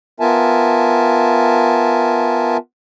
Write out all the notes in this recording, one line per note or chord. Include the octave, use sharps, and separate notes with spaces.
B3 F4 A#4 E5 G#5 A5